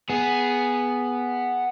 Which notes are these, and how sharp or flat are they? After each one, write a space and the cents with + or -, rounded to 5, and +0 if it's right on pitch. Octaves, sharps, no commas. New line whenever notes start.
B3 +0 G#4 +0